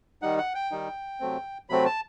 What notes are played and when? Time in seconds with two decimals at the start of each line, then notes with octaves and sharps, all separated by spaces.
0.22 D#3 G3 D#4 F#5
0.38 F#5
0.55 G5
0.71 D#3 G3 D#4
1.20 C3 F#3 A3 C4
1.70 C3 F#3 A3 C4 B5
1.86 A5